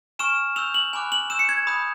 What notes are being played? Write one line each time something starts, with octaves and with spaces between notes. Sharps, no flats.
G#5 C#6 F6 E7
C#6 E6 G6 F7
F#7
G#5 B5 D6 F#6 F#7
F#7
C#6 E6 G6 E7
C#7
G#6
B5 D#6 G6